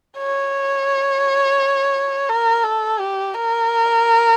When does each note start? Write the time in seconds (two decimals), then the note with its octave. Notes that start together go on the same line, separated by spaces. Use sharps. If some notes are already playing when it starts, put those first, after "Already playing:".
0.18 C#5
2.29 A#4
2.63 A4
3.00 G4
3.34 A#4